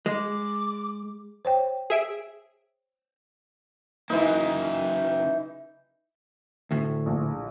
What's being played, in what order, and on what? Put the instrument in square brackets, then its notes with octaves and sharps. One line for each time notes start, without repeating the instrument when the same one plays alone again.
[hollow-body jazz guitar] G#3 [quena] D6
[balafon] C5 C#5 G5
[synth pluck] G#4 E5 D7
[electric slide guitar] C#3 F#3 A#3 [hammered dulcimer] E3 D#4
[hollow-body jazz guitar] D2 A2
[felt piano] A#1